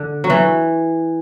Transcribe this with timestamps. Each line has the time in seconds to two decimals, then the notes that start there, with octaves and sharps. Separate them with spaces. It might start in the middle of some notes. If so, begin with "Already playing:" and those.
Already playing: D3
0.24 F#3
0.30 E3